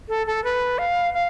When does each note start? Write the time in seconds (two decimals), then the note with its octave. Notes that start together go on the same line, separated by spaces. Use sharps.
0.09 A4
0.27 A4
0.44 B4
0.78 F5
1.14 F5